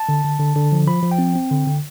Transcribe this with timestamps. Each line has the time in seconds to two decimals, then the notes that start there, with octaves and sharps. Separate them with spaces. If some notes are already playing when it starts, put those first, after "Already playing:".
Already playing: A5
0.09 D3
0.24 D3
0.40 D3
0.56 D3
0.72 F3
0.87 F3 B5
1.03 F3
1.12 G5
1.19 C4
1.35 C4
1.51 D3
1.67 D3